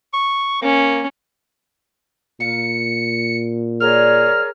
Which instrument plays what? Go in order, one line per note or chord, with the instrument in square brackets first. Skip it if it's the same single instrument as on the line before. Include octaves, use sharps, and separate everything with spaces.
[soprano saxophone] C#6
[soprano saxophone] A#3 [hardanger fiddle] C#4
[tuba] A#2 [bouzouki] F5 A#5 [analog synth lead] C#7
[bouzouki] D3 G3 A#3 [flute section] G#4 A#4 C#5 [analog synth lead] F6